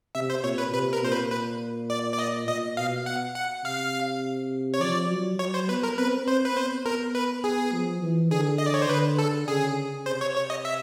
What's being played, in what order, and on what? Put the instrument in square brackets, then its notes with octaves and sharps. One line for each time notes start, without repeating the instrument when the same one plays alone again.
[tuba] C3 [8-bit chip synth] E5
[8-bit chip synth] C5
[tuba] A#2 [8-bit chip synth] C#5
[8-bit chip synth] B4
[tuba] C3 [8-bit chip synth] B4
[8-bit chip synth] A#4
[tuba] A#2 [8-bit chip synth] C5
[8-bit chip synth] B4
B4
D5
D5
D#5
[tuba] A#2 [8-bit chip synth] D#5
[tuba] B2 [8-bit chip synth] F5
[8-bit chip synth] F#5
F#5
[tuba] C3 [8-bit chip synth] F5
[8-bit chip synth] C#5
[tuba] F3 [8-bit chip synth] D5
[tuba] F#3
[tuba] F#3 [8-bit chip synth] C#5
[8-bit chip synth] C5
[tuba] B3 [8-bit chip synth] B4
[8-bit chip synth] A#4
[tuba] C4 [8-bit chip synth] B4
[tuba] C4 [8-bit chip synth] C5
[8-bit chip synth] B4
[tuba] B3 [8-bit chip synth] C5
[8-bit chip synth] A#4
B4
G#4
[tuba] F3
E3
[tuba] D3 [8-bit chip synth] G#4
[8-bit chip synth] D#5
D5
C#5
C5
[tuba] D3 [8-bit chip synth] B4
[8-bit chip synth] A4
[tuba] C#3 [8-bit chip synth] G#4
[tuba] C3 [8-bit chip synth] C5
[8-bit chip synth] C#5
C#5
D#5
E5